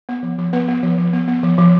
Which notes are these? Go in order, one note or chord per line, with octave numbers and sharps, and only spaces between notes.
B3
F3
F3
B3 B4
B3
F3
F3
B3
B3
F3
F3